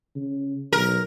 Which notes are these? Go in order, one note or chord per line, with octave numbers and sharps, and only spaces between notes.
C#3
B1 A#4